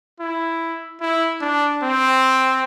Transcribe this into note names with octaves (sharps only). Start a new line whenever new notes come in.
E4
E4
D4
C4